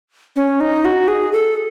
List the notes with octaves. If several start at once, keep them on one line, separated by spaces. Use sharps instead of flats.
C#4
D#4
F#4
G#4
A4